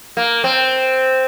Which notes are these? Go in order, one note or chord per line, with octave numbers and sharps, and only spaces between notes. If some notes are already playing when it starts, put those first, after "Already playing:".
A#3
C4